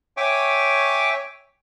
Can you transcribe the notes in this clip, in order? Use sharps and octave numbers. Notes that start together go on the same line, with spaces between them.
C#5 E5 G5 G#5 C#6 D6